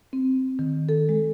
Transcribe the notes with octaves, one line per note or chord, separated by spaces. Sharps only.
C4
D#3
A4
G#3